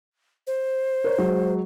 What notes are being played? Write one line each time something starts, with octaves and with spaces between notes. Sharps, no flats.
C5
A#4 C#5
F#3 G#3